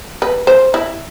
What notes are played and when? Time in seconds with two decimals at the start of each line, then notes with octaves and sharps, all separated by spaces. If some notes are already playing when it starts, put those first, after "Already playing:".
0.22 B4
0.47 C5
0.74 E4